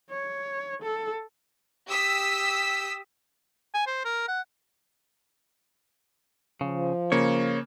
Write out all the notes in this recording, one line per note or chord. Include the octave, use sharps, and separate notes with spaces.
C#5
A4
G4 D#6 E6 B6
G#5
C5
A#4
F#5
C#3 F3
C#3 A#3 C#5